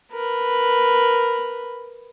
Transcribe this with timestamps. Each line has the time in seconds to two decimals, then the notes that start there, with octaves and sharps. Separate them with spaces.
0.12 A#4 B4